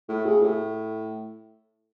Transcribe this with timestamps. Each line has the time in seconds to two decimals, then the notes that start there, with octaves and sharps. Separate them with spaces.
0.09 A2
0.25 C#3
0.42 A2